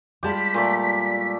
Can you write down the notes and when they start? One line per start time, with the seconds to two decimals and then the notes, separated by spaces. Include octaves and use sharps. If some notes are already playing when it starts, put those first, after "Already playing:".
0.23 G3 G#3 F4 G4 A5 B5 B6
0.54 A#2 A3 D5